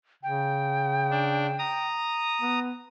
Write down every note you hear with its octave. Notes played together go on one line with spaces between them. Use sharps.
C#3 G5
D4
A#5 D#6
B3